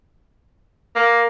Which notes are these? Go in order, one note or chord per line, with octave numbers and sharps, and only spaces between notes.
A#3